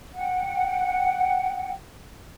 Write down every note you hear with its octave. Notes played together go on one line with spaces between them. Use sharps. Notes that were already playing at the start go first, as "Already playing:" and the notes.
F#5 G5